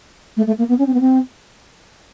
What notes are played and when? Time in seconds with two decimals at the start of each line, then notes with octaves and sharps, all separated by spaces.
0.37 A3
0.47 A3
0.58 A#3
0.69 B3
0.78 C#4
0.87 C4
0.94 B3
1.00 C4